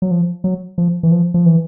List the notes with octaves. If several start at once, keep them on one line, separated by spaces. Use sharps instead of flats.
F#3
F3
F#3
F3
E3
F3
F3
E3